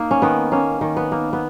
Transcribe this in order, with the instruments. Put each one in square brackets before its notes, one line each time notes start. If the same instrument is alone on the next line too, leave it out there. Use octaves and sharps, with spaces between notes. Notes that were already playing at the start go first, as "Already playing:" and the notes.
Already playing: [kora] A#3 D#4
C#4
D#3 B3
A#3 C#4
D#3
B3
A#3
B3